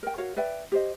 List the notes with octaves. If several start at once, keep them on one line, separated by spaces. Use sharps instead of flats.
A#4 G5
F#4 A#4 C#5 F5
B4 D5 E5 G5
G4 C5 D#5